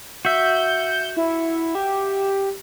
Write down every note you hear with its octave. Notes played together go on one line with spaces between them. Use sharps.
F#4 E5 G6
E4
G4